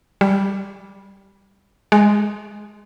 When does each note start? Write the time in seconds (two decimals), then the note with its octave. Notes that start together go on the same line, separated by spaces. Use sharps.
0.21 G3
1.92 G#3